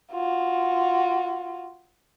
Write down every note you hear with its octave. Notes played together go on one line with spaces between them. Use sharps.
F4 F#4